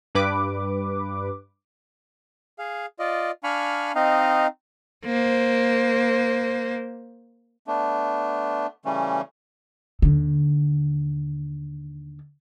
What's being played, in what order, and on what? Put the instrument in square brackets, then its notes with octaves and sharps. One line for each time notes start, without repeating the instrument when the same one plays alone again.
[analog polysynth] G2 B4 D6
[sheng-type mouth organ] G#4 F5
F4 D5 D#5
D4 F5 G#5 B5 C#6 F6
C4 D#4 D#5 F5
[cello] A#3 C5
[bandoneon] A3 B3 D4
C#3 E3 G3 A3 C#4
[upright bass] D#2 D3